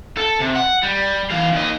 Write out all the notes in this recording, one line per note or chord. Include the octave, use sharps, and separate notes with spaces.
A4
C3
F#5
G3
E3 F5
D#2 D#5